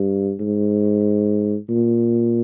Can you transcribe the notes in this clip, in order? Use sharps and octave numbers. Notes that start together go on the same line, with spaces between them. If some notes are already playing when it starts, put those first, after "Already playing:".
Already playing: G2
G#2
A#2